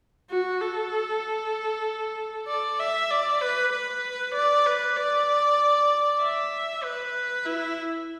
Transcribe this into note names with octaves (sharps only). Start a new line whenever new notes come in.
F#4
A4
D5
E5
D5
B4
B4
D5
B4
D5
E5
B4
E4